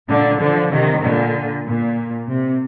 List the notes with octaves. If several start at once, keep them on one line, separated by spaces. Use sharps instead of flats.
A#2 D3
D3 F3
C3 D#3
A#2 D3
A#2
C3